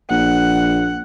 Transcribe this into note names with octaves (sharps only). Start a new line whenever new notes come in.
A#1 F#5